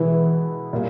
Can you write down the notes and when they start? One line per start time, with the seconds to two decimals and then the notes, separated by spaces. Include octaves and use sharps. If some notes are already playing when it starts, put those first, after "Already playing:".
Already playing: B2 E3 G#3 B3 E4
0.73 A#2 G3 A#3